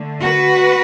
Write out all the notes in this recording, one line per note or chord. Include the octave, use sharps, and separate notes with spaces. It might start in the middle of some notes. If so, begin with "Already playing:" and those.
Already playing: D3 A3
F#4 B4